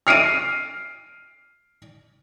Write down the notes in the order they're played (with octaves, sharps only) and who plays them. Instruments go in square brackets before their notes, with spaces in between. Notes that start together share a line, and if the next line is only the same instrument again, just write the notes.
[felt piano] F6 C7 D7 D#7